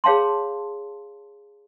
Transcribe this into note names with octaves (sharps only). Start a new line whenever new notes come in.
G#4 C#5 F5 A5 C6